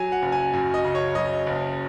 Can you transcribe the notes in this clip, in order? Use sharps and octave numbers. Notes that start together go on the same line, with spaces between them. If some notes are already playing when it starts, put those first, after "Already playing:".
Already playing: F#3 G#5
F#5
F#1
G#5
F#2
D#5
C#3
C#5
F#3 D#5
F#1